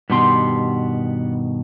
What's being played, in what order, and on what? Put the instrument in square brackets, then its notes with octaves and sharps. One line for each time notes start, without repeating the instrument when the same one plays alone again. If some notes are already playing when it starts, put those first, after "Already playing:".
[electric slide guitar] G2 B2 D#3 [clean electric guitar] B3 G4 C6